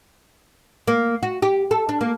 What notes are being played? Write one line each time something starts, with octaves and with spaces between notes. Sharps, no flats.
A#3
F#4
G4
A4
D4
A#3